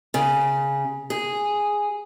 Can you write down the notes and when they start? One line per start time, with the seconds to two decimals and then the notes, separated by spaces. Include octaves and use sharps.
0.14 C#3
1.10 G#4